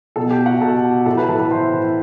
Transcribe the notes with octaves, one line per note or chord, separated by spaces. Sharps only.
B2 A4 A5
G4 G5
F#4 F#5
B2 A4 A5
A2 A4 A5
B4 B5
E3 A4 A5
B4 B5
A2 C5 C6
E3